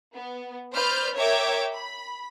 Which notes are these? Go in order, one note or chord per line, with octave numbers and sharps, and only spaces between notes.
B3
B4 C5 D5 B5 F6 G6
A#4 C#5 E5 G5 D6 G#6
B5